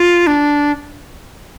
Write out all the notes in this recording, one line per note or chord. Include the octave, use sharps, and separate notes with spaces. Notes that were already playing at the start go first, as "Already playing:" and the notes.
Already playing: F4
D4